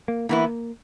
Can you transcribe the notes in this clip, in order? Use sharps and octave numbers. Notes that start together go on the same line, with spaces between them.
A#3
E3 A#3 B3 E4